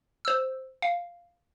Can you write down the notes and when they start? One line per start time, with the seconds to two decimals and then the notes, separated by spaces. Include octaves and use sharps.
0.25 C5 E6
0.82 F5